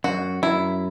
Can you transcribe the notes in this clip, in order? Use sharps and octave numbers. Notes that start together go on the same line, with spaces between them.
F#2 F#4
F#2 E4